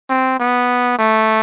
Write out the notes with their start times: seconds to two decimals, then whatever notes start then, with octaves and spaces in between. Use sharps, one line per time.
0.10 C4
0.40 B3
0.99 A3